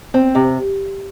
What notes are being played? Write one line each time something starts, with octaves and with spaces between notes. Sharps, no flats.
C4
C3